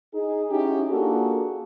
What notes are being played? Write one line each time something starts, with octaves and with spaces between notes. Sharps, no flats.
D#4 G#4
C#4 D#4 E4 F#4 G4
A#3 D4 F4 F#4 G#4 A4